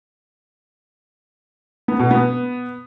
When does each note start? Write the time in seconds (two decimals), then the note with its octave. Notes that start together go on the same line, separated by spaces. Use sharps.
1.88 B3
1.99 B2
2.11 B3